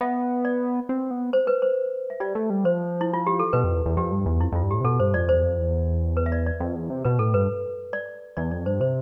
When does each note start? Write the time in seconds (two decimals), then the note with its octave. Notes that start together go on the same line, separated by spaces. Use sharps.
0.01 B3 E5
0.45 D5
0.89 C4
1.11 B3
1.33 C5
1.47 B4
1.62 C5
2.10 E5
2.20 G3 D5
2.35 A3
2.50 G3
2.64 F3 C5
3.01 E4
3.14 F4
3.27 G4
3.39 A4
3.53 B2 B4
3.64 F2
3.75 E2
3.86 E2
3.97 F2 G4
4.12 G2
4.26 E2
4.41 F2 E4
4.52 F2 F4
4.63 G2
4.71 A2 G4
4.81 C3
4.84 B2 A4
5.00 G2 C5
5.14 F2 D5
5.29 E2 C5
5.43 F2
5.59 E2
6.17 B4
6.26 E5
6.32 D5
6.46 D5
6.60 F2
6.75 E2
6.90 C3
7.05 B2 B4
7.19 A2 A4
7.34 G2 B4
7.93 D5
8.37 E2 D5
8.51 F2 D5
8.66 G2 C5
8.80 C3 C5